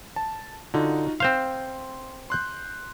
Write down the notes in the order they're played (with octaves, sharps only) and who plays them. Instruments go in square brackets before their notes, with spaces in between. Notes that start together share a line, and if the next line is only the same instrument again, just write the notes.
[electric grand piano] A5
[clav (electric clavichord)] D3 [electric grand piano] D#4 F4 F#4
[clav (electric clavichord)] C4 C5 F5 [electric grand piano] C6
[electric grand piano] C6 F#6 G6